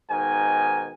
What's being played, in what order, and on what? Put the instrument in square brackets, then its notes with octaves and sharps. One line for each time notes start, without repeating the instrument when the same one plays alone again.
[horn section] G#2 B2 D#3 G#5